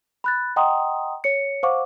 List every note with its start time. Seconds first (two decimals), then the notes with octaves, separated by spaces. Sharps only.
0.24 B5 F#6 A6
0.56 D#5 F#5 G5 A#5 C6 D#6
1.24 C#5 C#7
1.63 C5 F5 F#5 C#6 D6